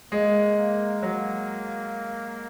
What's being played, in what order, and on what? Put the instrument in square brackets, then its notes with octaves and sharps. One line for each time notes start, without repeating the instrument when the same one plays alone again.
[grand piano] G#3 [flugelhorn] A#3
[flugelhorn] A#3
[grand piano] F#3 [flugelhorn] A#3